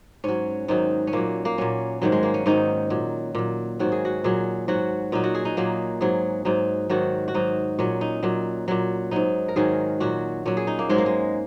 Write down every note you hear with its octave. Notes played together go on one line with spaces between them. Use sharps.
G#2 F#3 C#4
G#2 D#3 F#3 D#4
C#4
A#2 F#3 A#3
A#3
A#2 F#3 C#4
G#2 D#3 F#3
G#3
A#3
C#4
G#2 D#3 F#3 D#4
A#2 F#3
A#2 F#3
G#2 D#3 F#3 F#4
G#4
F#4
A#2 F#3 G#4
G#2 F#3 F#4
A#2 F#3 D#4
F#4
G#4
D#4
A#2 F#3 A#3
G#2 F#3 G#4
G#2 F#3 D#4
G#2 D#3 F#3 F#4
F#4
G#2 F#3 D#4
A#2 F#3 C#4
D#4
A#2 F#3
A#2 F#3
G#2 F#3 D#4
A#4
G#2 D#3 F#3 G#4
A#2 F#3 F#4
A#2 F#3 C#4
G#4
D#4
A#3
G#2 F#3 G#3
A#3
G#3